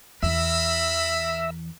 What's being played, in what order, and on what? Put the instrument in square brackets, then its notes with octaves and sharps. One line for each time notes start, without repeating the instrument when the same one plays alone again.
[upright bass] E2 E3 [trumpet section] A#4 B5 [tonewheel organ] E5